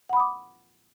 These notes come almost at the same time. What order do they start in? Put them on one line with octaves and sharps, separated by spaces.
F#5 B5 D#6 D6